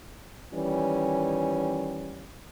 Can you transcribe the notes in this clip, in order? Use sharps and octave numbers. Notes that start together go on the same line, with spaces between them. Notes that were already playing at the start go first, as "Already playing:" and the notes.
D#3 E3 G3 C#4